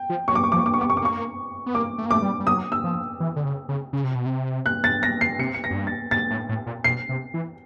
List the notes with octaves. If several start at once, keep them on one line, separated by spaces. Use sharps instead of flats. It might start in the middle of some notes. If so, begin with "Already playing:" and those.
Already playing: G5
F3
F#3 C#6
D6
C#6
F3 D6
C#6
D6
C#6
B3
D6
C#6
D6
A#3 C#6
B3
A#3 D6
A3
A#3
A3 D6
G3
G3
F#3 D#6
E6
F3
E3
D3
C#3
C#3
C#3
C3
B2
C3
F#6
A6
A#6
C7
C3 C#7
C#7
A#6
F#2
G2
A6
G#2 A6
A2
A2
A#2
B2 C7
C3
E3